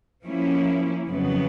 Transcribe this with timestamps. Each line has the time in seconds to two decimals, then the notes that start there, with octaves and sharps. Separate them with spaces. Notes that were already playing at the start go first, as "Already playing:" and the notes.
0.24 F3 A#3 C#4 E4
1.08 F2 C#3 F#3 B3